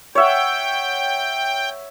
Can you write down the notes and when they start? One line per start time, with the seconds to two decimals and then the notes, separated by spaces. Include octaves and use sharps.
0.15 C#5 E5 F#5 G5